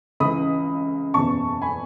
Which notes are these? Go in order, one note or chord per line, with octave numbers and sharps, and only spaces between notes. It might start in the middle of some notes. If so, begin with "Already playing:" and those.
C#2 C#3 E3 B5 D#6
F#1 E2 B2 A5 C#6
G#5 B5